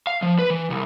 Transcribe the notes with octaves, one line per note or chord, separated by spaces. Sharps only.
F5
F3
B4
E3
C2